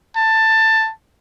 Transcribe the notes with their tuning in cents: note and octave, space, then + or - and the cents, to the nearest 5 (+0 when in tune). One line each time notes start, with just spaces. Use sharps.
A5 +15